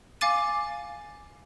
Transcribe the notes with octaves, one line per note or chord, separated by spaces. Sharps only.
F5 G#5 D6 A6 D#7